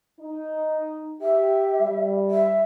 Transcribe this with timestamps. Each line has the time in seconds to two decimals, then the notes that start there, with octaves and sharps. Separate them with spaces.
0.20 D#4
1.21 G4 E5
1.80 G3
2.31 E5